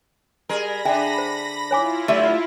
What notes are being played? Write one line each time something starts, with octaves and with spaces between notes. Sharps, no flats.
G3 G#4 A#4 B5 A#6
D3 D4 G#4 E5 G5 G#5
C5
E4 F4 C#5 G#5 D6
D3 F#3 A3 G4 E5